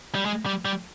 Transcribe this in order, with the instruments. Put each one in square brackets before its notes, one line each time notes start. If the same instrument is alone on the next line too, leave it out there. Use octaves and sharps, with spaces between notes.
[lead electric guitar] G3
G#3
G3
G3